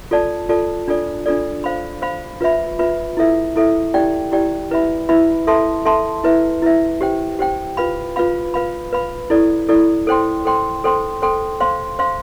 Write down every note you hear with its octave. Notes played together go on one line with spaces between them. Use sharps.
F4 A4 D5 A5
F4 A4 D5 A5
D4 F4 A4 D5
D4 F4 A4 D5
C5 F5 B5
C5 F5 B5
F4 B4 E5 B5
F4 B4 E5 B5
E4 A4 E5
E4 A4 E5
E4 G4 D5 G5
E4 G4 D5 G5
E4 B4 E5 B5
E4 B4 E5 B5
A4 E5 A5 C6
A4 E5 A5 C6
E4 B4 E5
E4 B4 E5
G4 C5 G5
G4 C5 G5
F4 B4 F5 B5
F4 B4 F5 B5
B4 F5 B5
B4 F5 B5
E4 A4 D5
E4 A4 D5
A4 C5 G5 C6
A4 C5 G5 C6
A4 C5 G5 C6
A4 C5 G5 C6
C5 F5 C6
C5 F5 C6